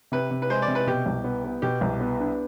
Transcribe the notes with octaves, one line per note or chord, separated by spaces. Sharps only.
C3 B4
C3
B4
G#3 C5
D5
C3
B4
B2 G4
C2
B3
B3
B2 G4
C2
B3
D4